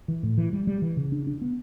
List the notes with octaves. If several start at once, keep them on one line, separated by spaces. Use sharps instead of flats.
E3
A2
E3
G3
G3
E3
C#3
D4
D4
B3